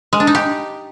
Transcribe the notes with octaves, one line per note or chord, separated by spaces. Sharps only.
G#3
D4
D#4
G4